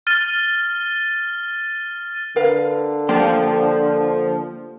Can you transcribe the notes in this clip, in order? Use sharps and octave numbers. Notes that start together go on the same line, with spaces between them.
F6 A6 D#7 G7
D3 A#4 B4 F5
F3 A#3 D4 G4 C5 G5